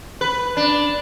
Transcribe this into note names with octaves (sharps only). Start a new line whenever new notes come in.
B4
D4